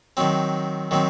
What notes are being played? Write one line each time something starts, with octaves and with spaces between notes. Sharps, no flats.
D#3 F#3 C4
D#3 F#3 C4